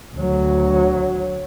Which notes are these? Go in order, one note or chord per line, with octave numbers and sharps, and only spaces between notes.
D2 F#3